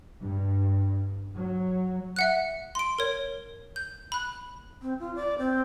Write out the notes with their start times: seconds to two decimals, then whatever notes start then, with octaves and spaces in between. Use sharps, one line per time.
0.23 G2
1.36 F#3
2.16 E5 F#5 F#6
2.75 C6 D7
2.98 A#4 C#5
3.76 G6
4.12 B5 F#6
4.82 C4
5.00 F4
5.16 D5
5.38 C4